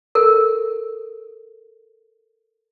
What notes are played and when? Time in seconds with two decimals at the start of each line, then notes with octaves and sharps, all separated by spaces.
0.15 A4 A#4